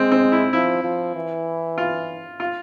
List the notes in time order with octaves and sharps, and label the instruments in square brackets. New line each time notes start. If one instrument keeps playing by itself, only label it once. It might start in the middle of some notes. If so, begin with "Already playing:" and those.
Already playing: [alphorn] G#3 [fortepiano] C4
[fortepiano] C4
E4
[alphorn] F3 [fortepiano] E4
[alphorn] F3
E3
[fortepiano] F4
F4